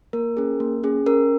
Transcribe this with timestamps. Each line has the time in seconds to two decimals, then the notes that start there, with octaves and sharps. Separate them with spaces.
0.13 A#3 A#4
0.37 C#4 G#4
0.60 A#3
0.83 C#4 G#4
1.06 C#4 A#4